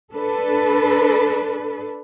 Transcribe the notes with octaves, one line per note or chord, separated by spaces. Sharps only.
D4 A4 B4